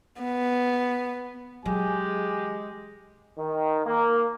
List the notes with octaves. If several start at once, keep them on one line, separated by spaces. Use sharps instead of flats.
B3
E3 F#3 G#3 G4 G#5
D#3
A#3